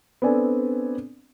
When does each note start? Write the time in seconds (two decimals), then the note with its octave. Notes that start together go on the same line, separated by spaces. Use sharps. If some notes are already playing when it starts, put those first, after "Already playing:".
0.22 B3 C4 D4 A4 D5 G#5